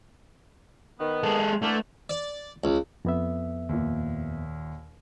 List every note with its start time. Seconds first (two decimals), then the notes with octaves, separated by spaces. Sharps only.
1.00 D#3 B3
1.23 G#3 A4
1.62 D3 E3 A3 A#3
2.10 D5
2.64 C#2
3.05 F2 B3 E5
3.69 D#2 A#2